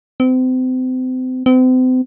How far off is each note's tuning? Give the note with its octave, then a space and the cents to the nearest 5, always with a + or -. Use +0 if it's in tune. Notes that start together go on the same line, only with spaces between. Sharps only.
C4 -35
C4 -40